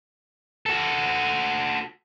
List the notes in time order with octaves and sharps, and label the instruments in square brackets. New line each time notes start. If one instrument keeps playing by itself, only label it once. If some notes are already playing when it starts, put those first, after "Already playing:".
[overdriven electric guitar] F#4 A4